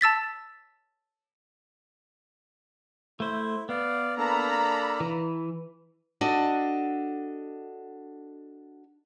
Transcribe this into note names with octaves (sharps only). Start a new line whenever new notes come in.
A5 E6 A6 B6
A3 E4 C5
B3 D5 F5
A#3 D4 A4 A#5 B5
E3
D4 F#4 A4 D#5